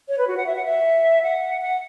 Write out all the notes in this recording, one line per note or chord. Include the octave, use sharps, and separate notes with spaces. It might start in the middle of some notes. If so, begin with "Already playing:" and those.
C#5
B4
F#4
F#5
E5
F#5
E5
F#5
F#5